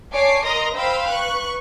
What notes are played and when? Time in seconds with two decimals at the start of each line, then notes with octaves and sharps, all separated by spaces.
0.12 C#5 D5 G#5 A5 D6 C7
0.44 A#4 D#5 A#5 C6 D#6 A#6
0.75 C5 F5 G5 B5 E6
1.10 B4 C#6 F#6